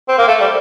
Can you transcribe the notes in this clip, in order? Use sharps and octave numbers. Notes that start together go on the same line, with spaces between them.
C4
A#3
A3
G3